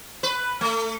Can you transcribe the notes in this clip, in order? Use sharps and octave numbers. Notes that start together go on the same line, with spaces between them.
B4
A3